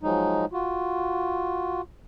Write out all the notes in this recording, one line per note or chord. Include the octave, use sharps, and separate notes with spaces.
F3 F#3 G#3 D#4
F4 F#4